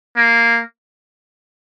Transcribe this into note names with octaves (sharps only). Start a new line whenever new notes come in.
A#3